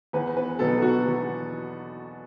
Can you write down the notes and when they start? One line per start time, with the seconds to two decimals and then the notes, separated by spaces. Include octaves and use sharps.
0.13 E2 B4
0.37 B4
0.59 B2 F#3 B3 A4
0.82 F#4
1.06 E2